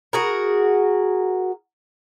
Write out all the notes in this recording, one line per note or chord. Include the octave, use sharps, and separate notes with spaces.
F#4 G#4 A#4